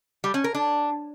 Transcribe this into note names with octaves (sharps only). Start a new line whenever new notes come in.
G3
C#4
A#4
D4